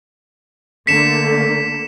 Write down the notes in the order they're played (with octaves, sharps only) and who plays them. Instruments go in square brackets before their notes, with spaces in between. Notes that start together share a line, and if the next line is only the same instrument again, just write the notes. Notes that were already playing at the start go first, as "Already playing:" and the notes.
[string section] D3 A3 A#3 [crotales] B6 C#7 E7